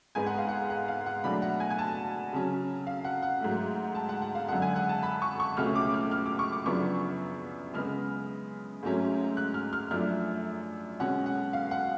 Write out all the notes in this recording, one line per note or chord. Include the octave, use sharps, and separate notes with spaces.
G#2 G#3 B3 G#5
F#5
F5
F#5
F#5
F5
F#5
B2 F#3 A3 D4 B5
F#5
G#5
G#5
A5
C#3 F#3 C#4
F5
F#5
F#5
G#2 F#3 A3
A5
F#5
F#5
F5
F#2 D3 G#3 F#5
G#5
F#5
A5
B5
C#6
C#6
C#2 B2 A3 C#4 F6
D6
F6
F6
D6
C#6
D6
F#2 C#3 F3 B3 D4 C#6
C#3 G#3 B3 F6
G#2 F#3 A3 C#4
F#6
F6
F6
F#2 F3 A3 D4 F6
B2 G#3 C#4 F#5
F#5
F5
F#5